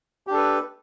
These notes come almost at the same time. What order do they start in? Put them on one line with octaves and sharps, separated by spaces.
G4 D4 A4 B4